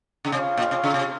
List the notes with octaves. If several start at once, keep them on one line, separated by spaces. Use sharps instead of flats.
C#3
C3 F4 G#4 C#5 F5
A#2
C3
C#3
C3